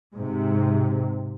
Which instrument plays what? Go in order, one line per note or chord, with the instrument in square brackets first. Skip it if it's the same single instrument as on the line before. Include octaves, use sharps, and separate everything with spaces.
[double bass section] G#2 C3